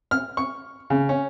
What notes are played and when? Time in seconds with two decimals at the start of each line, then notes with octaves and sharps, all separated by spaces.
0.11 F6
0.37 C#6
0.90 C#3
1.09 C#4